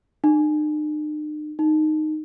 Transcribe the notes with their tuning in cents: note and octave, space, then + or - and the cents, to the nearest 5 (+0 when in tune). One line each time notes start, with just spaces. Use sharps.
D#4 -45
D#4 -10